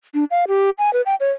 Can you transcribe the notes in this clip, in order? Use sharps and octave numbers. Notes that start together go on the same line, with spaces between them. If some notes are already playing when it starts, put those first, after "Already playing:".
D4
F5
G4
G#5
B4
G5
C#5